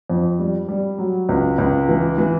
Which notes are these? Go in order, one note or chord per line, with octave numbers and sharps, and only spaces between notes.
F2
G3
G3
F#3
C#2
C#2
E3
E3